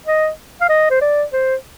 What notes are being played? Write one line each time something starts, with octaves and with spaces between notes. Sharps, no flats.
D#5
F5
D#5
C5
D5
C5